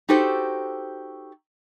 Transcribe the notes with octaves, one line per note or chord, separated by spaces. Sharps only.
D#4 F#4 G4 A4 C5